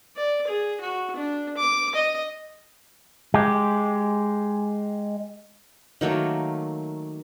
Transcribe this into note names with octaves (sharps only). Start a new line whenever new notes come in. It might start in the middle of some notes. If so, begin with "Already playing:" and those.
D5
G#4
F#4
D4
D6
D#5
G#3 G4
D#3 F#3 A3 A#3